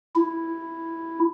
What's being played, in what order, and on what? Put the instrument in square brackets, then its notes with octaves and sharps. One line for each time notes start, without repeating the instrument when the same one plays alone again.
[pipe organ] E4